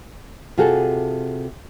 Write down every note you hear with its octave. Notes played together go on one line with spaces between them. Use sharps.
C3 F4 F#4 G#4 A4